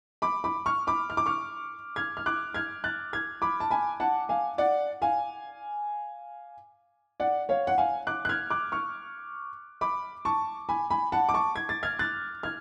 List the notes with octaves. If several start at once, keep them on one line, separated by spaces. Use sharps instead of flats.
B5 D6
B5 D6
C#6 F6
B5 D6
F6
D6
C#6 F6
F6 G#6
F6
D6 F#6
F6 G#6
F#6 A6
F6 G#6
B5 D6
A5
G#5 B5
F#5 A5
F5 G#5
D5 F#5
F5 G#5
D5 F#5
C#5 F5
F#5
F5 G#5
D6 F#6
F#6
F6 G#6
D6 F#6
C#6 F6
B5 D6
A5 C#6
G#5 B5
G#5 B5
F#5 A5
D6
A5 C#6
G#6
A6
F6 G#6
F#6 A6
F6 G#6